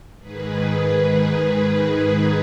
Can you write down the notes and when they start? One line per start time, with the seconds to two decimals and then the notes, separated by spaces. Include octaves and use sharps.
0.20 G#2 D#3 G#4 B4
0.62 G#4 B4
1.46 G#4 B4